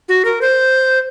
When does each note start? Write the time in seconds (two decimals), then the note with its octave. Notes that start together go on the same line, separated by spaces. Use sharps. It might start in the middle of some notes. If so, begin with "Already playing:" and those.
0.09 F#4
0.25 A#4
0.41 C5